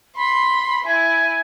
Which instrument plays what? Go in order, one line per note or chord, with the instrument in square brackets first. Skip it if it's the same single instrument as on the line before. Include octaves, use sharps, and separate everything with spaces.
[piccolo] B5 [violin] C6
[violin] E4 [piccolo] G#5